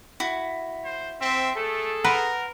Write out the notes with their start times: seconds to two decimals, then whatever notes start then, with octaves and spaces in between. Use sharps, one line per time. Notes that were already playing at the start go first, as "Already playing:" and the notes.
0.20 E4 F#4
0.85 C5
1.21 C4 E5
1.56 A3 G#4 A4
2.04 A#4 B4 F#5 A#5 C6